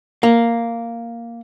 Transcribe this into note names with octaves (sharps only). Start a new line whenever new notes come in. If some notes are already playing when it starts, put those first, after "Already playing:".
A#3